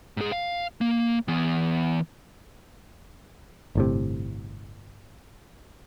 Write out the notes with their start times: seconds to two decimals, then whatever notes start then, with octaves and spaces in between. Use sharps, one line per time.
0.17 G#2 G#4
0.32 F5
0.81 A#3
1.28 E3 B3
3.75 G1 A2 C3